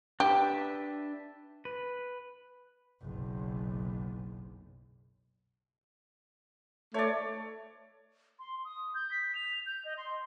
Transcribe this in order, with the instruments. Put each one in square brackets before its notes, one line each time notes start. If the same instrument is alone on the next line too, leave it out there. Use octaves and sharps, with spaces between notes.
[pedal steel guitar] D4 B4 E5 [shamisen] G4
[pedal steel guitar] B4
[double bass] F#1 B1
[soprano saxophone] A3 [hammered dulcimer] C#5 D5
[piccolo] C6
D#6
G6
B6
F7
G6
D#5
C6